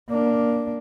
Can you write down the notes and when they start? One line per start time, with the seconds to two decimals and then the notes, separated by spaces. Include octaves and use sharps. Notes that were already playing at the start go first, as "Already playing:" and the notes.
0.10 A#3 D4